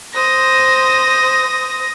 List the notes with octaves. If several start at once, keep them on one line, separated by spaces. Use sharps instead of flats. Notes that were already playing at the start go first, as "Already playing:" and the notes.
C5 D#6 A#6